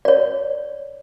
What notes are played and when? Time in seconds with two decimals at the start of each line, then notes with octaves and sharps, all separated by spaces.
0.05 C#5 D5